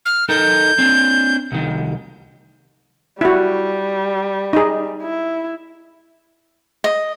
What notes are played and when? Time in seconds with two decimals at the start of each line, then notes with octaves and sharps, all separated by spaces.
0.06 F6
0.29 D#4 A4 A#4 G6
0.79 C4 D4
1.52 C2 D#3
3.21 G3 E4 F#4
4.53 D#4 G#4
5.02 E4
6.84 D#5